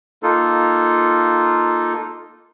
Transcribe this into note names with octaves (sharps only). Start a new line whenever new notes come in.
A#3 D#4 F4 A4